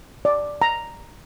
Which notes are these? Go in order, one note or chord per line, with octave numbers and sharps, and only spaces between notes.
D5
A#5